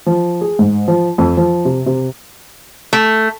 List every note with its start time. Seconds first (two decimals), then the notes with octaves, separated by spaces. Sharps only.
0.06 F3
0.41 G#4
0.59 G#2
0.88 F3
1.18 F2
1.37 F3
1.65 C3
1.86 C3
2.93 A3